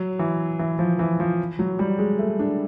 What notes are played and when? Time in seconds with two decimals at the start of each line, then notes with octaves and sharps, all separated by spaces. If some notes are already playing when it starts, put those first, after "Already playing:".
Already playing: F#3
0.19 E3
0.59 E3
0.79 F3
0.99 E3
1.20 F3
1.59 F#3
1.79 G3
1.99 G#3
2.19 A3
2.39 D4